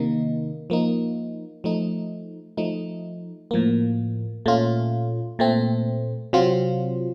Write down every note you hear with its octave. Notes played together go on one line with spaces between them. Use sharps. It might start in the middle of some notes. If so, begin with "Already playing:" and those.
Already playing: C3 D#3 A#3 D#4
F3 A#3 D#4
F3 A3 D#4
F3 A3 D#4
A2 F3 A#3
A#2 A3 C#4 F4
A#2 A3 C4
C3 F#3 C4 F4